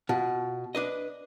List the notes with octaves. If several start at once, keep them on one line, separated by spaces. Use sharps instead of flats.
B2 F4
D4 B4 D#5